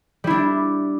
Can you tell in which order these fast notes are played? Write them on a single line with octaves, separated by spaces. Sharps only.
G3 E4 D4